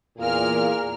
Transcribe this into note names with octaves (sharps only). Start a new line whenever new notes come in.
E2 A#2 G#4 A#4 F6